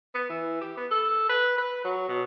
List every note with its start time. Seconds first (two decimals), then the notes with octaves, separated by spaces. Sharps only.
0.15 B3
0.30 E3
0.61 G4
0.77 B3
0.91 A4
1.29 B4
1.58 B4
1.85 F#3
2.08 B2